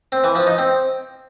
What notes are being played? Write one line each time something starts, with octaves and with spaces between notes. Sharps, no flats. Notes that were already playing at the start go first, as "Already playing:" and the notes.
C4
E3
F3
D#4
C4